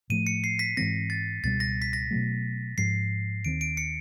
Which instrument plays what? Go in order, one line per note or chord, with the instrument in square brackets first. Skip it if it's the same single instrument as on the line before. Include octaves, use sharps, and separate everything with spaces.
[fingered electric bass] A2 F3 A3 [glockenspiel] D#7
[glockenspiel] C#7
C7
B6
[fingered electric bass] G#2 E3 G#3 C4 [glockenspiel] A#6
[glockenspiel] A6
[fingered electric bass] C#2 B2 G3 [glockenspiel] A6
[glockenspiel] A#6
B6
A#6
[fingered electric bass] B2 F#3 A3
[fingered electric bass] G#2 F3 G#3 [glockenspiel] C7
[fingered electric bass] D#2 D#3 G3 C4 [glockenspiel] D7
[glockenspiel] D7
C#7